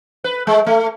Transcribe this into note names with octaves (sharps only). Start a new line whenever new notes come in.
B4
G#3
A3